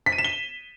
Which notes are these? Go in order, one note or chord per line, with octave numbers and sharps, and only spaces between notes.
B6
D#7
E7
G7